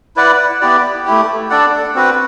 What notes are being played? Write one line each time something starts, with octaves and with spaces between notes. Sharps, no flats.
E4 B4 D5 F#5
B3 E4 G4 D5
A3 E4 G4
D4 A4 D5 F#5
C4 F#4 B4 F#5